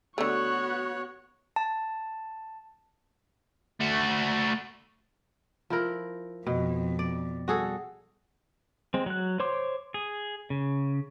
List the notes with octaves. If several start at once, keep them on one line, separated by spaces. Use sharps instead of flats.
D3 A3 B3 F#4 C#5 C#6 F#6
A5
A3 F#4
F3 E4 A#4
F2 B2
D5
G3 F#4 G#4 A4
G#3 C4
F#3 F#6
C5 C#5 C6 D6
G#4
C#3